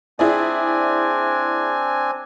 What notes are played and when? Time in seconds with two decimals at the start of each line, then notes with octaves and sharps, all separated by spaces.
0.19 C4 D4 E4 G#4 D5 G#5